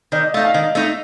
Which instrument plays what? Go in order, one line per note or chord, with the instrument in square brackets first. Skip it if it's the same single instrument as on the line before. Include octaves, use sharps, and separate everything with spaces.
[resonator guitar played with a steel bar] D#3 [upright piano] D5
[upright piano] D#5
[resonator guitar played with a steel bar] A3 D#4 [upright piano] F5
[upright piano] F5
[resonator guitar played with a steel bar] D#3 [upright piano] D#5
[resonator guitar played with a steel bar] A3 D#4